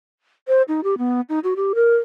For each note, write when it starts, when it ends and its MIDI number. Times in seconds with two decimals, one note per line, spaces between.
0.48 0.62 72
0.68 0.81 63
0.84 0.98 67
0.98 1.21 59
1.29 1.39 63
1.44 1.54 66
1.56 1.73 67
1.75 1.96 70